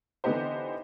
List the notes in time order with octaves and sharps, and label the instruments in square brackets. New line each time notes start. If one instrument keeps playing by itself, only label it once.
[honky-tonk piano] D3 E3 B3 D#4 G4 C5